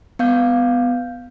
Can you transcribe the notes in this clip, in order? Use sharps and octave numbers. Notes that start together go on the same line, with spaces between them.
B3 F5 G6